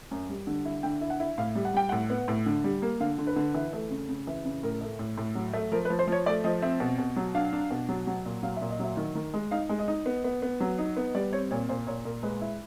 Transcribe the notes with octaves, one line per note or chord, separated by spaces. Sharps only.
F#2
G3
D3
E4
D3 G5
E4
F#5
E4
A2 F5
G3
F#5
G3 G5
A2 F#5
B3
A2
D3
G3
A#3
D3 F5
D3
B4
D3
E3
A3
C#3
C#3
E3
C#3
A2 A#4
A3
A2
A2
F#3
A3
F3 A#4
B4
F3
C5
F3 C#5
A3 D5
F3 D#5
C4 E5
B2
B2
F#3
D4 F5
D4
B2
F#3
F#3
A#2
F#3 F5
E5
A#2
D#5
F#3 E5
D#3
D#3
G#3
D#4 F5
G#3
D#5
D#4
B3
B3
B3
F#3
D#4
B3
G3 D5
C4 C#5
A#2 C#5
A#2 C5
A#2 C#5
A#2 A#4
G#3 B4
E4